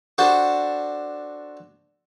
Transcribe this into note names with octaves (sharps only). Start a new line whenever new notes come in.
D4 F#4 A4 C5